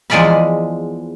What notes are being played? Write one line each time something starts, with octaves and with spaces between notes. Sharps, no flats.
E2 F3 G#3 D5 F5 B5